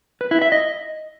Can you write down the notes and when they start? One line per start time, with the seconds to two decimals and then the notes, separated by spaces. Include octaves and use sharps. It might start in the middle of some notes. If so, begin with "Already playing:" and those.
0.21 B4
0.31 E4
0.42 E5
0.52 D#5